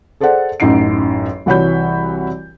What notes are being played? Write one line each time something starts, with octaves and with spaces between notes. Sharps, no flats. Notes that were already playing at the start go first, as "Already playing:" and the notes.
G#4 A4 C5 D5 F#5
A1 F#2 D#4 F#5 C7 D7
C2 E3 F#4 C#5 B5 G6